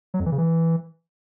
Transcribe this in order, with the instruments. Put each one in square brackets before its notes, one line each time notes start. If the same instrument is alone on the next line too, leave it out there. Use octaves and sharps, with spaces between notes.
[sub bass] F#3
F2
E3
C#3
E3